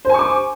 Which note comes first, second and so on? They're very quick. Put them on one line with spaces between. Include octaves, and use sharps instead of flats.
C5 G#5 C#6 D6